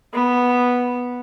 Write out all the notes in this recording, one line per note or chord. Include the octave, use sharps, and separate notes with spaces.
B3